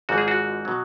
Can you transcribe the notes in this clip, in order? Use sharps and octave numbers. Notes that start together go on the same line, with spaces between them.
G#1 G#2 F3 F#4
G#4
F#4
B2 F#3